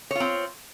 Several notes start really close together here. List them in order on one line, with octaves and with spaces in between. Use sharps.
C#5 F4 C4